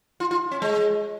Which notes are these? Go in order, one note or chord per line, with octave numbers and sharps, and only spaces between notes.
F4
F4
C#4
G#3